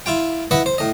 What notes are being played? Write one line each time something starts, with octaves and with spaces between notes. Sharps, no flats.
E4 F4 G5
E4 B4 D#5 F#5 B5
C5
A2 D#5